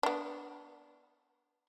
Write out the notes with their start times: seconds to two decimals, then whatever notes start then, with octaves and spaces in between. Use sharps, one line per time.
0.03 B3 D4